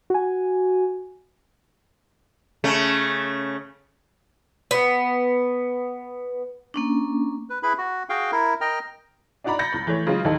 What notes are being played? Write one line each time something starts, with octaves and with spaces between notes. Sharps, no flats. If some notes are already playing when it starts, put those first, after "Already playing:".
F#4 G#5
C#3 A3
B3
A#3 C#4 D4
B4
E4 G#4 B4 B5
F#4
F#4 G#4 F5 G5
E4 A#4
A#4 D#5 G5 F6
D4 D#4 F#4 D5 A#5 B5
B5 G6 A6 A#6 C#7
C#2 B5
E3 A3 C#5
C#3 F#3 G#3 F4
D#2 D#3 D#4 A4